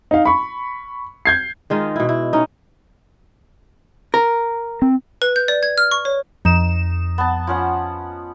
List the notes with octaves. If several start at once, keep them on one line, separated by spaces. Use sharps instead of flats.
D#4 F5
B5 C#6
G6 G#6 C7
D#3 G#3 D#4 F4
B2 E4
E4
C#4 D#4
A#4
C4
B4
G6
D5
G#6
F6
C#6
C#5
F2 D#4 E7
B3 A5
F3 C#4 F#5